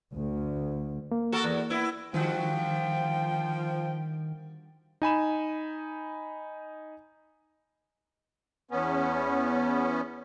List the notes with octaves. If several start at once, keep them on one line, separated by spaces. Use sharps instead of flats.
D2
A#3
F#4 A4 A#4
E2
B3 E4
D3 D#3 F3 G3 F#4 G5
D#4 G#5 B5 E7
E2 B3 C#4